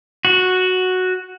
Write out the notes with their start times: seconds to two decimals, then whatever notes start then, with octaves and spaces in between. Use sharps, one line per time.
0.25 F#4